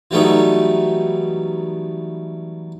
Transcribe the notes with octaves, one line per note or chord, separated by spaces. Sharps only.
E3 F#3 G3 A3 B3 D#4